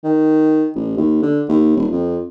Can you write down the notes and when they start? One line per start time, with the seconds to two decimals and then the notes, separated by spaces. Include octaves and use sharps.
0.04 D#3
0.75 A1
0.97 D#2
1.22 D3
1.48 D#2
1.76 D#1
1.92 F2